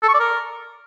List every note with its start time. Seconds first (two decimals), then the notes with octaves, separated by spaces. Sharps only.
0.03 A4
0.09 C#6
0.14 D5
0.20 A#4